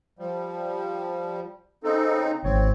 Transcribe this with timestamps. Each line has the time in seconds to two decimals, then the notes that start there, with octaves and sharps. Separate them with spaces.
0.19 F3 G3
1.84 C#3 C4 D#4 A4
2.44 G#1 C4 C#5